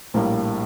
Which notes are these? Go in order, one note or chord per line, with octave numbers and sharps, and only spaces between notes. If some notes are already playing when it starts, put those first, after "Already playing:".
A#1 A2 G3 A#3